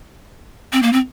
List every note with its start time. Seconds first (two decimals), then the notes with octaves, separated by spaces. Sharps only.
0.73 C4
0.82 A#3
0.93 C4